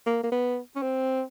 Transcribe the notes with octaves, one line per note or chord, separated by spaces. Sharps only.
A#3
A#3
B3
C#4
C4